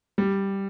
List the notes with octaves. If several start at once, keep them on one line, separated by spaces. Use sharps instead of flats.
G3